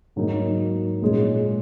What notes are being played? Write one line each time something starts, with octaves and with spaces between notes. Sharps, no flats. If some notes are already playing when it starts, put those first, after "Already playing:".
G#2 F#3 A#3 D#4
A#2 G#3 C#4 G#4